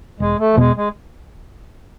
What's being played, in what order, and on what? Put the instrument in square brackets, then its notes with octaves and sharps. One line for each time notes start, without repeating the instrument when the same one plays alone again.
[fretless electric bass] E1 [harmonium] G#3
[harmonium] A3
F3
[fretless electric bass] E2 B2 B3 [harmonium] G#3
[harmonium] G#3